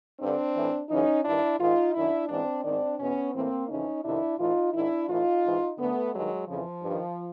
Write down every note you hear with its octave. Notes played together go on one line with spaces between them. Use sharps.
G2 D3 C4 D4
A2 E3
F#2 C#3 E3 C#4 D#4
G2 D#3 D4 E4
G#2 D#3 D#4 F4
F#2 D#3 D4 E4
G#2 E3 C4 D4
G#2 D#3 C4 D4
E2 B2 B3 C#4
A2 E3 A#3 C4
F2 C#3 E3 C#4 D#4
F2 C3 D#3 D4 E4
A2 E3 D#4 F4
G#2 D#3 D4 E4
A2 E3 D#4 F4
G#2 E3
F#2 D3 A3 B3
G2 D#3 F#3 G#3
F2 C#3 E3 F3
G2 D#3